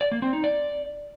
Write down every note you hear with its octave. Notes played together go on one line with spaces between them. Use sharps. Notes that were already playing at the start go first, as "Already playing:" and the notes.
D5
A#3
C4
D#4
D5